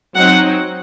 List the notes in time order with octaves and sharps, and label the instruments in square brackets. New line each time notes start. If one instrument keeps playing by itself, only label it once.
[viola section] F#3 C4 D#4 F#5